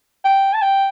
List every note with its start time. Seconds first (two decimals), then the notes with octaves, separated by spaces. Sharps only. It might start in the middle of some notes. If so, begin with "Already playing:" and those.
0.25 G5
0.53 A5
0.62 G5